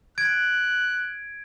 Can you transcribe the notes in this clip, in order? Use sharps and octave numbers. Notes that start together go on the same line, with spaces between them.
F#6 G#6 D7